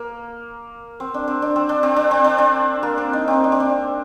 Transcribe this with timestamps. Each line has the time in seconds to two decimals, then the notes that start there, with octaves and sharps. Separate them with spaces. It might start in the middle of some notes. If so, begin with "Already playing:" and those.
Already playing: A#3
1.00 C4
1.14 D4
1.28 C4
1.42 D4
1.56 C4
1.69 D4
1.83 C4
1.96 D4
2.11 C4
2.24 D4
2.38 C4
2.83 A#3
2.98 C4
3.13 D#4
3.28 C4
3.44 D4
3.52 C4
3.60 D4